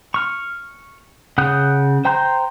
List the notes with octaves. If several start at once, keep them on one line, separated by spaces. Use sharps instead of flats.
C#6 F6
C#3 F#5 D#6 F#6 G6
C5 G5 A#5 C6 G6